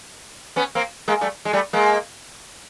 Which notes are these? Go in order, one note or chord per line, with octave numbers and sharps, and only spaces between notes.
B3 C#4
A#3 C4
G#3 A#3
G3 A3
G#3
G3 A3
G#3 A#3